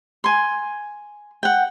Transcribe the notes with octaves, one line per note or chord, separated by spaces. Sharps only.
G#5 C6
F#5 G5